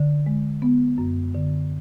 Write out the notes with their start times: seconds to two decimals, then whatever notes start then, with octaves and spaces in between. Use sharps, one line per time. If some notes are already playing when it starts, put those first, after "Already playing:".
Already playing: D3
0.26 G#3
0.62 B3
0.98 F#2
1.34 D3